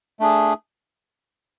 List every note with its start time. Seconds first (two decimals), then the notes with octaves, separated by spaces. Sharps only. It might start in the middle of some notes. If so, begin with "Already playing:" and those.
0.20 A3 D4 G#4